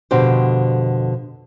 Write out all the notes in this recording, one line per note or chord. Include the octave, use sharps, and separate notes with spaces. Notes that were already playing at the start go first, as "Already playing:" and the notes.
F2 B2 D3 G4 C5